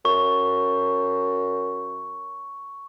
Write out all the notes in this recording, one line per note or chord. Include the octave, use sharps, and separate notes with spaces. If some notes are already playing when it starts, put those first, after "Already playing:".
F#2 C#6